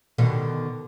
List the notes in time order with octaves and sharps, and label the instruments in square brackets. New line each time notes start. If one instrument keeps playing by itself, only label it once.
[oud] B2 D3 D#3